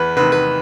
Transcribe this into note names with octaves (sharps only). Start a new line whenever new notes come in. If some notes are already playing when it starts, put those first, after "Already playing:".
Already playing: E2 B4
C3 D#3 B4
B4